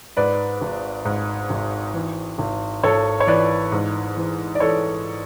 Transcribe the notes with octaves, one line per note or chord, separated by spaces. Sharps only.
G#2 B4 D5
G#1
G#2
G#1
E3
G#1
G#1 A4 C#5
C#5
E3 B4 D5
G#2
E3
D5
E3 A4 C#5